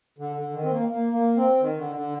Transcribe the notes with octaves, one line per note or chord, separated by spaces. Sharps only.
D3
D3
D#3
C4
A#3
A#3
A#3
C4
D#3
D3
D3